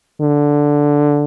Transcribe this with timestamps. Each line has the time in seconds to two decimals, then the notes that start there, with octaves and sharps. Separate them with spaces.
0.21 D3